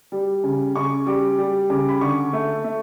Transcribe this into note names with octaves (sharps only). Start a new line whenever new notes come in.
G3
C#3
C#3 C#6
G3 D6
G3
C#3 D6
B5
D3 C#6
A3
A3